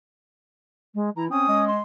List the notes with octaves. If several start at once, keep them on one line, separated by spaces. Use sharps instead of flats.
G#3
E3 E4 A#5
C4 C#4 D#6
G#3
C6